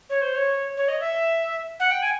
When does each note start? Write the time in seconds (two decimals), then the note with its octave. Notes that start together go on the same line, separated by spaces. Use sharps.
0.10 C#5
0.22 C5
0.35 C#5
0.77 C#5
0.88 D#5
1.00 E5
1.80 F#5
1.91 G5
2.02 G#5